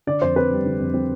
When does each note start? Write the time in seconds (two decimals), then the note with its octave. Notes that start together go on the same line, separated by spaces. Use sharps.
0.07 D3 D5
0.22 F2 C5
0.36 C4 B4
0.51 G3
0.66 D3
0.80 F2
0.94 C4